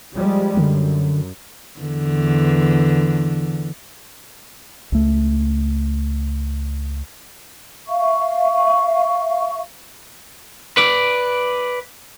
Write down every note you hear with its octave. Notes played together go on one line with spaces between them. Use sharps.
F3 G3 G#3
F#2 D3
E2 D3
C#2 A3
E5 F5 C#6
B4 D5